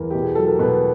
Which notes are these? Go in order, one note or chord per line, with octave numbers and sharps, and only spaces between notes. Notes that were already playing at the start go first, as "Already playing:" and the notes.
Already playing: E2 A#4
B2 G4
G#4
F#3 A4
A#4
B2 B4